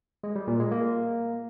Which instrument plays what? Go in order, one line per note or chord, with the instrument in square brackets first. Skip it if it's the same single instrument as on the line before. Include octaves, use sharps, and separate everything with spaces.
[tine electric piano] G#3
G3
A#2
G#3
A#3